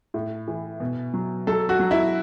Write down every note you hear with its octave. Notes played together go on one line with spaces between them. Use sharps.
A2
E3
B2
F#3
F#3 A4
F#4
F#3
E4